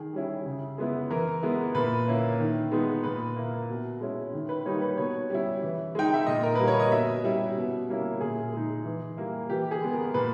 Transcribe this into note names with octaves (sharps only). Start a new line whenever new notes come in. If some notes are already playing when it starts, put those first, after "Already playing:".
Already playing: D#3 G#4
G3 C#4 E4
C#3
G#3 B3 E4
E3 A#4
G#3 B3 E4
A#2 B4
A#3 C#4 E4
D#3
G#3 B3 D#4
A#2 B4
A#3 E4
B2
G#3 C#4 E4
D#3
B4
G3 A#3 D#4 C#5
B4
B2 C#5
G3 C#4 E4
E3
G#3 D#4 G5
E5
A#2 D#5
A#4
G3 A#3 B4
C#5
D#5
B2 E5
G3 C#4 E4
B2
G3 A#3 C#4 E4
A#2 G#4
G#3 D#4
E3
G3 A#3 E4
E3 G4
G#4
G#3 B3
A#4
A#2 B4